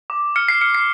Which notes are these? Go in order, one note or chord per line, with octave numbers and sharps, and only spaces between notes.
D6
F6 C#7
C7
F6 C#7
C7